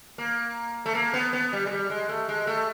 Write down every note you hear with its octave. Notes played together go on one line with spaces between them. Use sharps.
A#3
A3
A#3
B3
B3
G3
G#3
G3
G#3
A3
G#3
A3